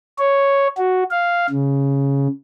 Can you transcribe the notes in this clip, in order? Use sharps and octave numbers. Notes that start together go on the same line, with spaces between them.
C#5
F#4
F5
C#3